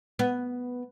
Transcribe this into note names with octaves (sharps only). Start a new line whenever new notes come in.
B3